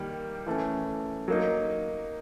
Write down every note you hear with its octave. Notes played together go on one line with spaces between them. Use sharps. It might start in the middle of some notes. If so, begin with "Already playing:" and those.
Already playing: D#3 G3 A#3
E3 A3 C#4
F#3 A#3 D#4